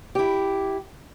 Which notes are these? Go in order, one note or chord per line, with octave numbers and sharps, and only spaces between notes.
E4 G4